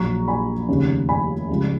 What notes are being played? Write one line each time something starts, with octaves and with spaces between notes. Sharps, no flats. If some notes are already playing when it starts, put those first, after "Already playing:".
Already playing: A#1 A#2 F#3 A#5 C#6
G#5 B5
F1 D#2 C#3
G#5 B5
C#2 C#3 F3